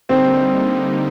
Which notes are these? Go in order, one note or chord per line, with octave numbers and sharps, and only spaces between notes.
D3 G3 A#3 C4 D#4